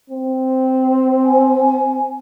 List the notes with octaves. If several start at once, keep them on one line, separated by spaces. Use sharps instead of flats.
C4
G#5